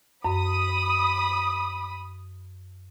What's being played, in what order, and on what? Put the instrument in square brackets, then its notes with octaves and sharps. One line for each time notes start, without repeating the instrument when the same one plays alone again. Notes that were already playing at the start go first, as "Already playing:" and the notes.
[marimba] F#2 [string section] B5 D#6